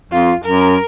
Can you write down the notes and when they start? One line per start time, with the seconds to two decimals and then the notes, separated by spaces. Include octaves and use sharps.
0.12 F2 F4
0.44 F#2 A#4